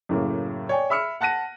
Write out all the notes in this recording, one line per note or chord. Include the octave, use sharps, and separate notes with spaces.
F#2 A2 C#3 A#3
C#5 D5 G5 G#5
E5 B5 E6 F6 C#7
F#5 A5 F#6 A#6 D#7